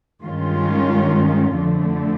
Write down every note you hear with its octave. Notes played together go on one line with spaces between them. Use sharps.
G2 D#3 G#3 C#4 F4
F2 D3 F3 A3